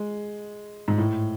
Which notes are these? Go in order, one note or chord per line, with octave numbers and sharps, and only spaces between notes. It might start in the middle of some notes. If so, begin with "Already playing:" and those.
Already playing: G#3
G#2
A2